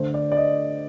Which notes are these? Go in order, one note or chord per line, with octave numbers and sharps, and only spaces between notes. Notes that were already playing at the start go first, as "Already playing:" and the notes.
Already playing: D3 A3 C5
D5
D5
D#5